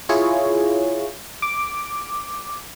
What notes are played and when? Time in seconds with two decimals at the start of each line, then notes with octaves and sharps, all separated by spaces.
0.09 E4 F4 G#4 C#5
1.42 D6